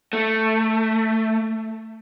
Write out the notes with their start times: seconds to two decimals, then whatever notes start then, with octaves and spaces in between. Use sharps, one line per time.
0.13 A3